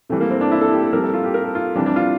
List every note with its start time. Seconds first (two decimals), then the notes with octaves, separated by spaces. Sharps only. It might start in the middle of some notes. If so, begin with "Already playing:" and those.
0.09 C3 E3 G3 A3
0.21 A#3
0.31 C4
0.41 D4
0.52 E4
0.61 A4
0.72 G4
0.83 A4
0.93 C3 G3 A#4
1.04 A4
1.14 F4
1.24 G4
1.34 A#4
1.44 A4
1.55 F4
1.76 C3 E3 G3 D4
1.86 D4
1.96 F4